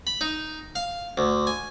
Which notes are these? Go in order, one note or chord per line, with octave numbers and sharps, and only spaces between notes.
B5
D#4
F5
D2
G#5